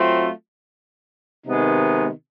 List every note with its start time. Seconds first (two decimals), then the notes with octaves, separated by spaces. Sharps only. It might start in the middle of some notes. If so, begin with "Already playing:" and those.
Already playing: F#3 A3 C4 F4
1.46 C3 D#3 G#3 B3 D#4